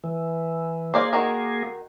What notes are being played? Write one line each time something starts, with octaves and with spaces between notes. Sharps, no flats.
E3
A#3 G#4 C5 D5 F5
D#3 F#4 A#4